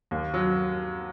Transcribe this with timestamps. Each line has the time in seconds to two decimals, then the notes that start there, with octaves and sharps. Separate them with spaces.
0.11 D#2
0.34 F#3